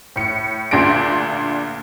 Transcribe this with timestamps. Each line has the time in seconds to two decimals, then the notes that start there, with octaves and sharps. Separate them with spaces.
0.16 A2 C#7
0.71 D2 A#2 D4 G#4 A#6 D7